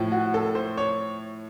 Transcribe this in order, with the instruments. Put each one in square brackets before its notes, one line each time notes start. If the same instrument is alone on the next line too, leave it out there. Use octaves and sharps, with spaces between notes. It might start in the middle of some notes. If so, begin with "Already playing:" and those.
Already playing: [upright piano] A2 F3
F#4
A4
C5
C#5